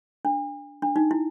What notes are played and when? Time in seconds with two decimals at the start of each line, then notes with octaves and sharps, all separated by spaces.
0.25 D4
0.82 D4
0.96 D#4
1.11 E4